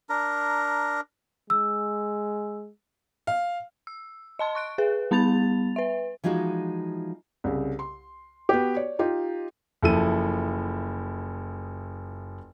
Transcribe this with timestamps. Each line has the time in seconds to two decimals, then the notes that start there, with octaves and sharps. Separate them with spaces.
0.09 D4 A#4 A#5
1.50 G#3 E6
3.27 F5
3.87 E6
4.39 D#5 A5 C6
4.55 C#6 F#6 D7
4.78 G#4 B4
5.11 G3 B3 B5 A6 F7
5.76 B4 E5
6.24 E3 F3 G#3 D#4 F#4
7.44 C2 C#3
7.79 C6
8.49 B3 F#4 G4
8.76 C#5 D5
8.99 D#4 F4 G4
9.83 F#1 F3 E4 A4 E6 D#7